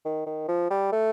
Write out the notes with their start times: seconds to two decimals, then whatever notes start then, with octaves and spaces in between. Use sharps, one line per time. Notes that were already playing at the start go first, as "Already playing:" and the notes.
0.05 D#3
0.26 D#3
0.48 F3
0.70 G3
0.92 A3